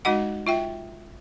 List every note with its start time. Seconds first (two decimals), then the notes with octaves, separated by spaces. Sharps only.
0.05 G#3 D#4 F#4 D#5 F#5
0.47 F4 E5 G5